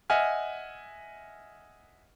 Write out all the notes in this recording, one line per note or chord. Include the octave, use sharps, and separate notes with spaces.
D#5 E5 F#5 G#5 F6